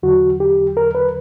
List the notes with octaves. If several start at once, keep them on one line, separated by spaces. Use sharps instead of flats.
E2 D3 F#3 F#4
G4
A#4
B4